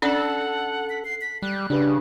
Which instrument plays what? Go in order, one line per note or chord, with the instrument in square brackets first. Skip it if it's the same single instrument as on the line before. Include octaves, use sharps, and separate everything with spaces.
[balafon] C#4 D4 D5 [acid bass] A4 [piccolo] F#5
[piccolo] B6
C7
B6
[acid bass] G3 [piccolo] F#6
[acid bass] C#3 [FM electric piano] D4 G4 B4